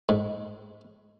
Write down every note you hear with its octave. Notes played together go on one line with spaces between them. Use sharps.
G#2